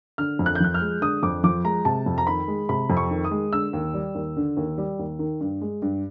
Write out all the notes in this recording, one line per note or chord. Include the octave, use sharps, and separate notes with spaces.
D3 F6
F2
F#6
G6
F3 F#6
F6
G#3
D3 D#6
F2 D6
F3 D6
G#3 A#5
C3 A5
F2
A#5
D#3 B5
G#3
C3 B5
F2
C#6
D#3
D#6
G#3
D3 E6
D#2
G3
D#2
D3
D#2
G3
D#2
D#3
G2
G#3
G2